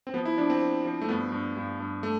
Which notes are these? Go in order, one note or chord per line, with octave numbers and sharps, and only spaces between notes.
C4
F3 B3
E4
F3 D4
C4
F3
F3
A3
G2 B3
G2
G2
G2
A3